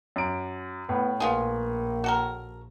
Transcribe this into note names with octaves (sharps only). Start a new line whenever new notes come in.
F#2 D7
A2 B3
A#1 A#3 B3 F4 G#4
F#4 A4 A#4